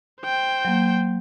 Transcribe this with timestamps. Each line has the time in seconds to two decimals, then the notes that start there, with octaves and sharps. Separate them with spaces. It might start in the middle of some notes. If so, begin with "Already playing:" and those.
0.22 C5 G5
0.65 F#3 A#3